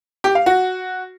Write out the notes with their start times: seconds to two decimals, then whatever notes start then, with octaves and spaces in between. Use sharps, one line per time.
0.24 G4
0.35 F5
0.46 F#4